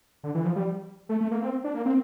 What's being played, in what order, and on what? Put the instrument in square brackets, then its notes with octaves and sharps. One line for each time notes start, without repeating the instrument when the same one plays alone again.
[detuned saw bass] D3
E3
F3
G3
A3
A3
A#3
C4
D4
A#3
C4